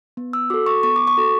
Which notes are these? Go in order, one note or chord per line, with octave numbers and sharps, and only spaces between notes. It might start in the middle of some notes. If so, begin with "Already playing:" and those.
B3
E6
F#4 A4 D6
C#6
B3 C#6
D6
C#6
F#4 A4